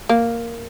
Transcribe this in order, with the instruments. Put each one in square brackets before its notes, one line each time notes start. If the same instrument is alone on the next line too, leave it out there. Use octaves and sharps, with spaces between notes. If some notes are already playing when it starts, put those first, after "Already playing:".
[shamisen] A#3